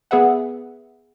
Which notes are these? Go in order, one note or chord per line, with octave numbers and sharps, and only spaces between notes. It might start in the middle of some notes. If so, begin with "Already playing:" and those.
B3 G#4 B4 E5 F#5